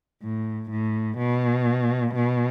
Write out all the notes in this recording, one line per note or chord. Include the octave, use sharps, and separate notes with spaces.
A2
A2
B2
B2